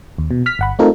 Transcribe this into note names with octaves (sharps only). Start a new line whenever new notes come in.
D#2
B2
F6 B6
G1 F#5 B5
A3 C4 D#4 F4 A4 A#4